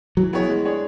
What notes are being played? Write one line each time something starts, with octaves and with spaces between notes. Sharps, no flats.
E3 F#3
B3 E4 G#4 C#5
G#3
D4 G#4 C#5